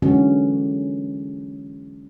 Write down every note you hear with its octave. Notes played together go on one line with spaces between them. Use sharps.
D3 E3 F#3 G#3 C#4 F#4